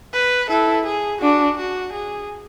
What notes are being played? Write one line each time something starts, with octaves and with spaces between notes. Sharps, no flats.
B4
E4 A4
G#4
D4 F#4
F#4
G#4